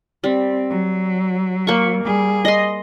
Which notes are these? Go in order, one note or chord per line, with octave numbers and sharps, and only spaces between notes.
G3 C4
F#3
A#3 C#6
G3 G#4
D#5 C6